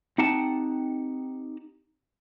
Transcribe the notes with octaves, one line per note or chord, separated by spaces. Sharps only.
C4 D#4 G4 F#5 G5 A5